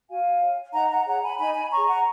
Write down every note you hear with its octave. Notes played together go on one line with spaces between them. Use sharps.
F#4 F5 G#5
C#5
D#4 F#5 A#5
F#5 A#5
G#4 C#5 F#5 A#5
G#5 B5
D#4 G#5 B5
G#5 B5
G#4 C#5 A#5 C#6
F#5 A#5